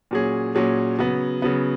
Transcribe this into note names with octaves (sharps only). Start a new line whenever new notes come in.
A#2 F#3 C#4 G#4
A#2 F#3 C#4 G#4
C#3 F#3 B3
C#3 F#3 B3